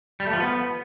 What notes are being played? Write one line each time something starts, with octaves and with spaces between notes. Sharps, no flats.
G3
A3
F3
B3